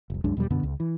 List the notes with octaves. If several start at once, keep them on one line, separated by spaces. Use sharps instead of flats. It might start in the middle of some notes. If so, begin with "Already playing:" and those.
F1 C2
C2 F#2 G#3 D4
E2 B2 F#3 G3
F#2 B2 D3 B3
C#2
E3